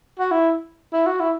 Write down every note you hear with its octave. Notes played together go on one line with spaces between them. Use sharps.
F#4
E4
E4
F#4
E4